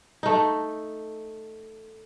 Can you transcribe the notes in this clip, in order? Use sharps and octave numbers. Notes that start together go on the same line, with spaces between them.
A3 D#4